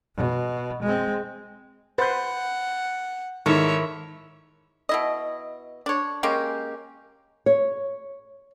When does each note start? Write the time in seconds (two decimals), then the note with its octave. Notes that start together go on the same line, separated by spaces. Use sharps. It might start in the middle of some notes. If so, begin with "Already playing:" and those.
0.16 B2
0.83 G#3 C4
1.98 B4 C5 F#5 G6 A6
3.46 G#2 D#3 E4 A4 C#5 E5 A5 C#6
4.89 B2 E4 D#5
5.86 D4 C#5
6.23 G#3 A#3 C#4 G4
7.46 C#5